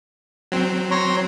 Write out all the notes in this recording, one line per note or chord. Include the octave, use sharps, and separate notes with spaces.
F#3 C4
C#5 A#5 C6